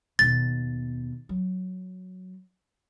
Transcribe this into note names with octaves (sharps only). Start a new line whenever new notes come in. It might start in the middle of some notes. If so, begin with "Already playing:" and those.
D#2 B2 A6
F#3